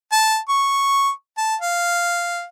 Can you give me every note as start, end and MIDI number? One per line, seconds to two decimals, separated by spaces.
0.12 0.37 81
0.49 1.10 85
1.37 1.55 81
1.61 2.44 77